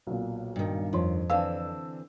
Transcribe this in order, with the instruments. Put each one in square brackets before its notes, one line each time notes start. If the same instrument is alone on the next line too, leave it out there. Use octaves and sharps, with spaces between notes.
[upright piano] B1 A#2
[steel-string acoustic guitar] G2 D#3
[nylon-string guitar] F2 [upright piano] F4 C#5 C6
[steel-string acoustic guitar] D3 E3 C4 [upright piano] D4 E6 [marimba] F5